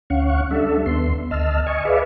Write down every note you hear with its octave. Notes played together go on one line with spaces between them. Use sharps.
D2 C#4 F5 F#5 C#6
G3 D4 A4 E5
D#2 B3 C6
D2 D#5 A5 E6 F6
D#5 G#5 C#6
G#4 B4 D5 E5 F5